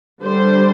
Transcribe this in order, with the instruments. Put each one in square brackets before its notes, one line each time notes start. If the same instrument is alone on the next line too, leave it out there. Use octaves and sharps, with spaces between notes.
[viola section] D3 G3 D4 C5